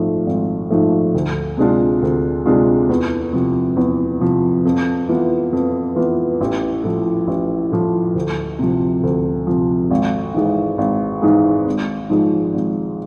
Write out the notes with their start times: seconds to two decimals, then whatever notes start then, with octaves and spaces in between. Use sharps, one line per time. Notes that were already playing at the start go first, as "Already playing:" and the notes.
Already playing: G#1 G#2 F3 A3
0.26 G#1
0.70 G#2 F3 A3
1.14 D2
1.57 C3 G#3 D4 F4
2.02 D2
2.46 C3 G#3 D4 F4
2.89 E2
3.33 C3 F3
3.77 E2
4.20 C3 F3
4.65 F2
5.09 E3 B3 F4
5.53 F2
5.96 E3 B3 F4
6.41 A1
6.84 A2 F3
7.27 A1
7.72 A2 F3
8.15 D2
8.59 C3 F3
9.03 D2
9.47 C3 F3
9.91 G#1
10.34 G#2 E3 G#3
10.78 G#1
11.22 G#2 E3 G#3
11.66 G#1
12.10 G#2 F3 G#3
12.54 G#1